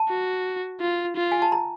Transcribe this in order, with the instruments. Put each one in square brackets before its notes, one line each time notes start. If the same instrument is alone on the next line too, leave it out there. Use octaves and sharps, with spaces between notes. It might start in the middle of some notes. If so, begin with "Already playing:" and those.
Already playing: [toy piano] A5
[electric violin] F#4
F4
F4
[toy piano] G#5
A5
A#5